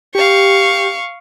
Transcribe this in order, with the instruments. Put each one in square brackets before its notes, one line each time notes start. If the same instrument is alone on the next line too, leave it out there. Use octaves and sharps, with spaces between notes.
[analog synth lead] G4 [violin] F5 C#6